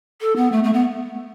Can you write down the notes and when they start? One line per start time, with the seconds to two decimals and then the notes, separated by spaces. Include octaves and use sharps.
0.21 A4
0.36 B3
0.52 A3
0.63 A3
0.73 B3